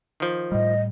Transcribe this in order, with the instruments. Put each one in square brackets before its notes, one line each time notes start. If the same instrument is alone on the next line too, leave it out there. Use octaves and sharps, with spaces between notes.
[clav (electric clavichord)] D#3 F3
[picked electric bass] A2 G3 [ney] D#5